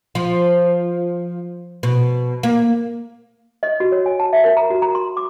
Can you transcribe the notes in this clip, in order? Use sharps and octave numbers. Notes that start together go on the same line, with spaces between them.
F3
B2
A#3
D#5
F#4
C#5
G#5
A5
E5
A#4
A#5
F#4
A#5
C6
D6